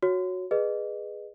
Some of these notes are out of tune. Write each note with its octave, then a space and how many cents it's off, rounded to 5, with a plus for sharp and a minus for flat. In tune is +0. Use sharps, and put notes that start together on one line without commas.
F#4 -10 C#5 +0
G#4 +0 B4 +0 D#5 -25